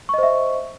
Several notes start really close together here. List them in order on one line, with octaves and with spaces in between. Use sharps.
C#6 D#5 C5 E5